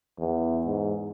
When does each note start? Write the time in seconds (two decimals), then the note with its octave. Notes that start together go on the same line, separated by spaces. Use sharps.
0.19 E2
0.67 G#2